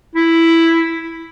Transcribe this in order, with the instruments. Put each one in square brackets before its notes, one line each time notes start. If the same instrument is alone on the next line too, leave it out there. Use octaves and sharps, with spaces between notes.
[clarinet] E4